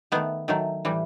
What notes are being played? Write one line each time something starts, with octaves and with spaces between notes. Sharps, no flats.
D#3 A3 B3
D#3 F#3 A3
A2 E3 G3